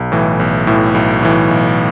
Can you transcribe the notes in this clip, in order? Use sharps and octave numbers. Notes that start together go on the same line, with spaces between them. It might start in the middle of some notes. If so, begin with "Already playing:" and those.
Already playing: B1
A2 E3
B1
A2 E3
B1
A2 E3
B1